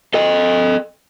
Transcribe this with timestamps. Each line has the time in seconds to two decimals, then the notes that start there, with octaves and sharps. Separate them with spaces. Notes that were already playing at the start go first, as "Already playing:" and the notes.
0.14 A4 D#5